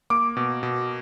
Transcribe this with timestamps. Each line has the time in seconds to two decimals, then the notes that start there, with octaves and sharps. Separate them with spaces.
0.10 A#3 D6
0.37 B2
0.63 B2